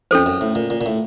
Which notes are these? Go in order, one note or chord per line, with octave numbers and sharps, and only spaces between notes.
F2 C#4 A4 C5
F#2
A2
A#2
A#2
A#2
A2